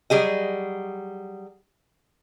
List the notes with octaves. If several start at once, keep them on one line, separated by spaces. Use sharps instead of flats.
F#3 G3 G#4 D#5